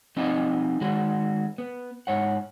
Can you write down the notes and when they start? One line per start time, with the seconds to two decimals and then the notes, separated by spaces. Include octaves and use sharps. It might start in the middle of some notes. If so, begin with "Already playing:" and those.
0.16 F3 C4 D#4 F#4 D#5
0.81 D#3 G#3 F#4
1.58 B3
2.07 G#2 C#5 F#5